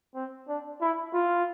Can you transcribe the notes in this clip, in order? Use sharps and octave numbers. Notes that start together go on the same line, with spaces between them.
C4
D4
E4
F4